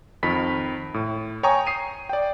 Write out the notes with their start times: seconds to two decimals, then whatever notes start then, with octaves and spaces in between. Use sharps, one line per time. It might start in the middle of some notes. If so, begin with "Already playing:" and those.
0.23 F2 D#3 B5 B6
0.94 A2
1.43 C#5 G5 G#5 A#5 C#6 D#6
1.67 D#6 C7 D#7
2.09 D5 G5